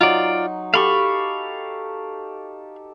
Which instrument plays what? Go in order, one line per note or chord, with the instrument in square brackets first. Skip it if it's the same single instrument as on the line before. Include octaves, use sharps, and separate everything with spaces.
[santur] F#3 D#4 C6 [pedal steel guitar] F4 D5
[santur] G4 A4 [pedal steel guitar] F5 B5 C#6